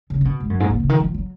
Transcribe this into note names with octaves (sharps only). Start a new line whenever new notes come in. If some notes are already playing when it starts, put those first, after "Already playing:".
C#3
C#3
B2
G#2
F#2
G#2
A#2
C#3
D#3
F3
F#3